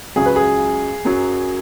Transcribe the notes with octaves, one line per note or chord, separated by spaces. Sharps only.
C#2 C#3 F#3 G#4
B4
G#4
F#2 F#3